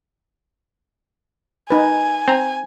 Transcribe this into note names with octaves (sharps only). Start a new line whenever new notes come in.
D#4 B4 G#5
C4 A#5